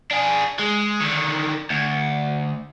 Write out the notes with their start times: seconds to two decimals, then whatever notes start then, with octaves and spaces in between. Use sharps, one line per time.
0.11 D4 G#4
0.59 G#3
1.00 D3 D#3
1.70 D2